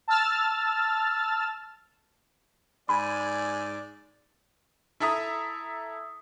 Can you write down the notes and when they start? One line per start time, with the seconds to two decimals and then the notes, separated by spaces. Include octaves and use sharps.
0.08 A5 E6 F6 A6
2.89 G#2 D5 G#5 B5
5.00 E4 A4 E5 A#5 D#6